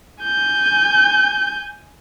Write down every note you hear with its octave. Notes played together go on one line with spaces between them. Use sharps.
G#5 G6